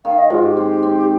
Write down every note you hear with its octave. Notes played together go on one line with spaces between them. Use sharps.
D#3 F5
D#5
G#2 F4
G4
C4
C4